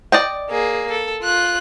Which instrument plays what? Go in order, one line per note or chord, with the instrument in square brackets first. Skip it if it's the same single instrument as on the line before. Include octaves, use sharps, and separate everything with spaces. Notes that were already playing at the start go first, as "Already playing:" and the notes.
[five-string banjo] D5 D#5 G5
[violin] A#3 G#4
A4
F4 F#6